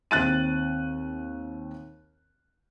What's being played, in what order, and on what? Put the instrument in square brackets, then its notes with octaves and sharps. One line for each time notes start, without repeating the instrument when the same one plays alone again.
[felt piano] D#2 C4 F#6 A6 D#7